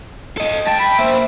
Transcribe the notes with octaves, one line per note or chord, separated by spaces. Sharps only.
A4 D#5
G2 G5 A5
B5
A#3 C5 E5